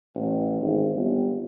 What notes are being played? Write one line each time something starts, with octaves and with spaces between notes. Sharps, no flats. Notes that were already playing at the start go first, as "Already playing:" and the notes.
A1
G#1
G1